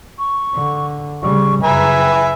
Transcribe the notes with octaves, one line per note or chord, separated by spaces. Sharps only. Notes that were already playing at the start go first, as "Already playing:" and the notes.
C#6
D3
C#3 G3 C#6
F#2 C#3 B4 E5 G#5 A#5
G5